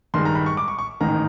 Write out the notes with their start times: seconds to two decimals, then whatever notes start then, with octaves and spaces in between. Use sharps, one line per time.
0.14 G2 D#3 G#3 C6
0.25 A#5
0.35 B5
0.46 C#6
0.57 D6
0.68 C#6
0.79 C#6
1.00 A1 G#2 D#3 A#5